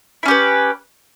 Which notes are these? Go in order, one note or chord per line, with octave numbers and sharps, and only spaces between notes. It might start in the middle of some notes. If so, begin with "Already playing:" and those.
C#4 E4 G4 B4